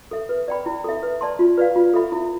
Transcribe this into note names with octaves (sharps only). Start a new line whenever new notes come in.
A4 E5
B4
D5 G5 B5
E4
A4 E5
B4
D5 A5 C6
F4
B4 D5 F5
F4
A4 E5 B5
E4